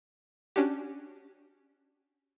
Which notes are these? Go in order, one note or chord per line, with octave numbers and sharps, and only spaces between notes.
C#4 D4 F#4 G4